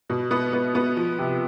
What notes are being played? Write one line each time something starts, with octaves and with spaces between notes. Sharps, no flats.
B2
B3
B3
B3
F3
C3